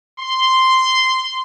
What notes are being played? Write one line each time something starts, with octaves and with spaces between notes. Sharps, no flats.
C6